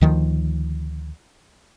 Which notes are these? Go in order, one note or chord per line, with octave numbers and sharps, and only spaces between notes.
D2 D#3 F3